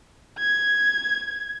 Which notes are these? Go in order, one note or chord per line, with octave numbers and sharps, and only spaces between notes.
G#6